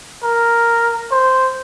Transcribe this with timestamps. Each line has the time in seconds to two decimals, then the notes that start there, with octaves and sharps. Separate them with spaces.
0.24 A#4
1.11 C5